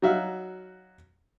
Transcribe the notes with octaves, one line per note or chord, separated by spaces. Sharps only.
F#3 D#4 F#4 E5 F5